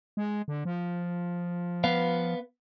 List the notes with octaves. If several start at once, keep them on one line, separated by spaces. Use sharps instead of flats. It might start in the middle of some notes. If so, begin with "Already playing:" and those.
G#3
D3
F3
B3 B4 F5